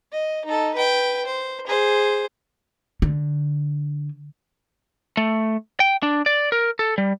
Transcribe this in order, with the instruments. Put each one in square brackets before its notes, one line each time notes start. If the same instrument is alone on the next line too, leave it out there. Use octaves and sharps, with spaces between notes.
[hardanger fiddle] D#5
D#4 A4
B4 G5
C5
G#4 C5
[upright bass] D3
[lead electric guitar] A3
G5
D4
D5
A#4
A4
G3